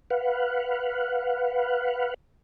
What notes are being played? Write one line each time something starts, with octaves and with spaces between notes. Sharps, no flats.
B4 F5 F#5